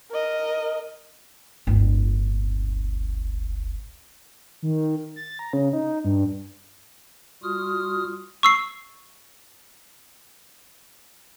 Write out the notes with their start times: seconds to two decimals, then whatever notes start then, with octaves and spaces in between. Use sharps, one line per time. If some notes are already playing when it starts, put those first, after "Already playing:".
0.11 A#4 D#5
1.67 D1 G1
4.62 D#3
5.16 A6
5.39 A#5
5.53 C#3
5.73 D#4
6.05 G2
7.43 G3 F4 F#4 D#6 F6
8.43 C#6 E6 C7